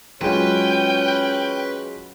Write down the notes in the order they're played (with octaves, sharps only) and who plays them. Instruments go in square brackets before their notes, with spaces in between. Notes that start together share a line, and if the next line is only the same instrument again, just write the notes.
[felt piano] F#3 G#3 F4 [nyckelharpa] C#4 [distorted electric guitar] B4 [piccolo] G5